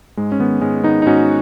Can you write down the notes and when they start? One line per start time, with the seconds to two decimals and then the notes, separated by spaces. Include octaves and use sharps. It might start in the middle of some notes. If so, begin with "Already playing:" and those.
0.17 G#2 G#3
0.32 C#4
0.39 D#3 B3
0.61 G#2 G#3 C#4
0.83 D#3 B3 D#4
1.02 D#4
1.06 G#2 C#4 F#4